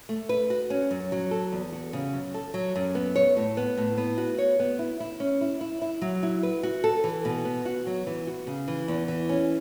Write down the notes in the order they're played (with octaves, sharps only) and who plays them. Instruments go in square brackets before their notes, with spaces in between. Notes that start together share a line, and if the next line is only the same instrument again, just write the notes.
[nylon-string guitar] A3
B4
F#4
C#4
F#2
F#3
A4
E2
F#4
C#3
F#2
A4
F#3
F#2
B3
C#5
A2
B3
A2
B3
F#4
C#5
B3
E4
E4
C#4
E4
E4
E4
F#3
E4
B4
F#4
A4
E3
B2
B3
F#4
F#3
E3
F#4
C#3
E3
E2
E3
C#4